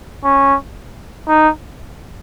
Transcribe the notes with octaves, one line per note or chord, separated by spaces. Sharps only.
C#4
D#4